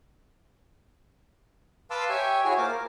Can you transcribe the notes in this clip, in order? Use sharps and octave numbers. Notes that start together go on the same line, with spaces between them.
B4 F5 A5 C6 D6 E6
G4 C#5 E5 G5 G#5
E4 F#4 G#4 C#5 G#5
A#3 F4 C5 D6
A#4